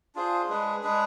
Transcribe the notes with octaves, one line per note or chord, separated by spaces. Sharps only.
D4 F4 G#4 C5
G#3 D4 G#4 B4
G#3 D4 G#4 B4